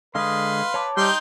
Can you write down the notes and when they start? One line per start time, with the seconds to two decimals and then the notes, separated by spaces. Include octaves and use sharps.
0.15 D3 G#3 B4 F5 C6 D#6
0.74 C#5 A5 D6
0.97 G3 D#4 G5 C6